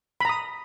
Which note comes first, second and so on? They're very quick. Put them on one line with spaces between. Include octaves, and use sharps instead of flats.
B5 A#5 D#6